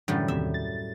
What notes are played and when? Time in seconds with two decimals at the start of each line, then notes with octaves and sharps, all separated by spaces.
0.08 F#2 A2 D3 E3 G3
0.28 D#2 C3 E5
0.54 A6